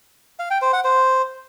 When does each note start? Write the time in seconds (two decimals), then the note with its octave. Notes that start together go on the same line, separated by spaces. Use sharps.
0.39 F5
0.51 G5
0.62 C5
0.73 F#5
0.84 C5